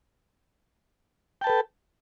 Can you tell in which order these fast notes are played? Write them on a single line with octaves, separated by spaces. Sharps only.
G5 A5 B4 A4